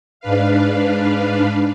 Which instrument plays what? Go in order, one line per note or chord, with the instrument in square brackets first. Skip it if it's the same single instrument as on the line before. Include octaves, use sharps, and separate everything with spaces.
[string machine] G#2 D4 B4 F5